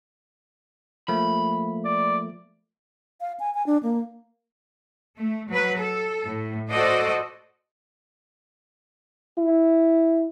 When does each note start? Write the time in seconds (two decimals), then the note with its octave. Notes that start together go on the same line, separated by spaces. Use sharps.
1.08 F3 A3 A#3 B5
1.85 D5
3.21 F5
3.40 G#5
3.54 G#5
3.66 D4
3.83 A#3
5.19 A3
5.50 F#3 B4
5.79 A4
6.26 A2
6.71 F#4 A4 C5 D5 D#5
9.38 E4